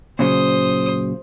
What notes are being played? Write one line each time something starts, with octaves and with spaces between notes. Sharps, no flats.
A#2 C#3 F#3 C5 D#6